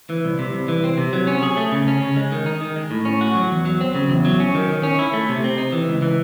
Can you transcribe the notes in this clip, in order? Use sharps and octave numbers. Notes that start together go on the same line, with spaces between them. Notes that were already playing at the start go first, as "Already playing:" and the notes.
E3
C2
C3
C2
E3
C4
C3
F#3
C#4
G#4
A3
C#3
C#4
C#3
G#3
D#3
D#4
D#3
G#3
A2
C#4
F#4
F#3
E2
F#3
C4
C#3
E2
F#3
C#4
D#3
D#3
C#4
E4
A3
C3
C4
D#4
E3
C#2
E3